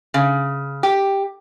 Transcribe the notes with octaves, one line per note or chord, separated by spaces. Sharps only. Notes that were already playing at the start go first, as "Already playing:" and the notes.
C#3
G4